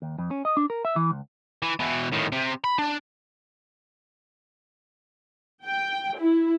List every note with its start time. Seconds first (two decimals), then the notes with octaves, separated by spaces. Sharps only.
0.02 D#2
0.18 F2
0.31 C#4
0.45 D#5
0.57 D4
0.70 A#4
0.85 E5
0.96 E3
1.11 C#2
1.62 E3
1.80 B2 E3
2.13 A2 D#3
2.32 C3
2.64 B5
2.79 D4
5.65 G5
6.18 E4